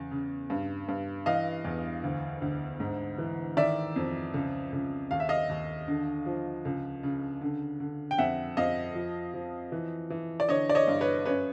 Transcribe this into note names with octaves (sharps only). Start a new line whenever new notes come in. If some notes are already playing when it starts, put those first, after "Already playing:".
Already playing: E2 C#3
C#3
G2
G2
E3 D#5 F5
E2
D2
D2
G#2
E3
D#3 D5 E5
F2
C#2
C#2
D#2 F5
E5
D#5 F5
D#2
D3
F3
C#2
C#3
D3
D3
G5
F2 E5 F#5
F2 D#5 F5
F3
F3
E3
E3
D5
D3 C#5 D#5
D5
C#5 D#5
G2
B4 C#5
F#2 B4 C#5